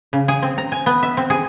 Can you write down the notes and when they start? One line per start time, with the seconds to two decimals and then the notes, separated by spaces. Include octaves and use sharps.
0.13 C#3
0.28 G#4
0.43 C4
0.58 A#5
0.72 G#5
0.86 B3
1.03 E5
1.17 C4
1.30 G#4